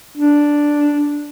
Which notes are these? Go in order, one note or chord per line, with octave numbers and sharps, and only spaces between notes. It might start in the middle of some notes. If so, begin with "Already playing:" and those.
D4